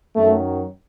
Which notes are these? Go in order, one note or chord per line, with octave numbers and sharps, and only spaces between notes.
F#2 D#3 F#3 A3